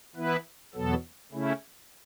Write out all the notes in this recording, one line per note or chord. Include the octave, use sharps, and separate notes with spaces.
E3 B3 E4 B4
E2 B2 F#3 B3 A4
C#3 A3 C#4 E4